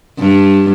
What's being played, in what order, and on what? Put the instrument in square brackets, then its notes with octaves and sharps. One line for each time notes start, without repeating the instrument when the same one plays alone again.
[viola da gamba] G2